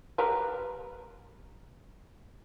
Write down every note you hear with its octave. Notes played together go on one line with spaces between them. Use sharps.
G3 A#4 B4